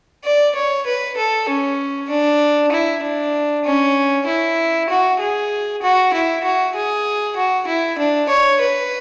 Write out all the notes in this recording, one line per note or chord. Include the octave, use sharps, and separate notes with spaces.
D5
C#5
B4
A4
C#4
D4
E4
D4
C#4
E4
F#4
G#4
F#4
E4
F#4
G#4
F#4
E4
D4
C#5
B4